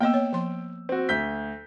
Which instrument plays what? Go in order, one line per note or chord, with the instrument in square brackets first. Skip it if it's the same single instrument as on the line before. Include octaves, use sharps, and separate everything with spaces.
[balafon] A#3 B3 D#5 [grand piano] G5 E6
[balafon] C#5
F3 C6
[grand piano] C4 F#4
D2 G6 B6